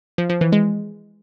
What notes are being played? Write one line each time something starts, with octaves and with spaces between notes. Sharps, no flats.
F3
F3
E3
G#3